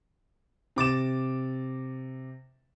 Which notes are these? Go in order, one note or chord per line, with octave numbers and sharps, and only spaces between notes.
C3 D6 A6 E7